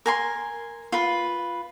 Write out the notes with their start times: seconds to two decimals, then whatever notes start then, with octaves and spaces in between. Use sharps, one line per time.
0.06 A#4 G#5 C6
0.92 F4 B4